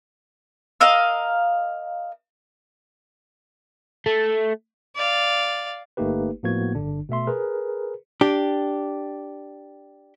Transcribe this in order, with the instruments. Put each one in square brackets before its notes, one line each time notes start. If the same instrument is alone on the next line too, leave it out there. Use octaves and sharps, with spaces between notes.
[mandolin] A#4 D#5 F5 E6
[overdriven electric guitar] A3
[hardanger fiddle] D5 F5
[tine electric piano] G1 A3 A#3 D#4 G4 B4
A2 F3 A#3 B3 F#4 G#6
G1 D3 D4
B2 A3 E5 C6
G#4 A#4 B4
[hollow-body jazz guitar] D4 G4